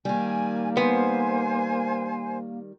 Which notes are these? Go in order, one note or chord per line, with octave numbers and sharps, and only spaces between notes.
D#3 G3 A#3 G#5
B3 C5 G#5